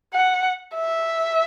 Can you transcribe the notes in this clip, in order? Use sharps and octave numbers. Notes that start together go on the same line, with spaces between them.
F#5
E5